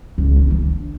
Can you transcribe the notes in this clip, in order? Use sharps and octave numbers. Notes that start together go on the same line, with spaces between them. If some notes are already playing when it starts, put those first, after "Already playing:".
C#2
E3
D4